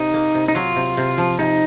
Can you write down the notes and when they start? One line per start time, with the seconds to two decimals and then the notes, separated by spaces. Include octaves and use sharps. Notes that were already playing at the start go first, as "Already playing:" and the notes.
Already playing: C3 D#4
0.14 A#3
0.34 C3
0.48 D#4
0.55 F#3 F4
0.76 C3
0.97 C3
1.18 F3
1.39 C3 D#4